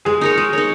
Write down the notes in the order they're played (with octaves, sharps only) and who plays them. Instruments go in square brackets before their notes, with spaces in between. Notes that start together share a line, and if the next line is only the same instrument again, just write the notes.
[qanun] G#3 [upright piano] G#4
[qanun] D#4 A#4 C#5
G#3
D#4 A#4 C#5